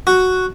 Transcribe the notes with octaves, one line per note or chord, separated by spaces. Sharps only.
F#4